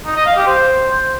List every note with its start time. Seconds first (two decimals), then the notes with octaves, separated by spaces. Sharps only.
0.06 D#4
0.16 D#5
0.26 F5
0.36 G4
0.46 C5